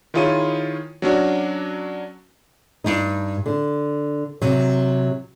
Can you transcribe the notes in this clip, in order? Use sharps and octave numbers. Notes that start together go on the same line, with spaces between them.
D#3 E4 F4 G#4 C#5 D#7
F#3 C#4 D4 F#4
G2 D#4
D3
C3 F#3